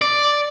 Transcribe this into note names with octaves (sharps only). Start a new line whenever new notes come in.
D5